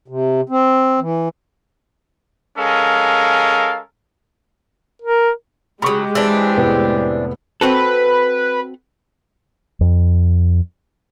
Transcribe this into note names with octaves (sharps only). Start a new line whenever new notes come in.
C3
C4
E3
G#3 C#4 A4 A#4 F5
A#4
C#3 F#3 G#3 G4 B5 C#6 D#6
E3 C4 D4 E6
F1 A2 B3
C4 F#4 A4 B4
F2